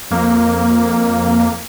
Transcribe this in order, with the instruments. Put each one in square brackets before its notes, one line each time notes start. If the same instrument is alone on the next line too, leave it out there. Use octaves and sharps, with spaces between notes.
[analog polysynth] F2 A#3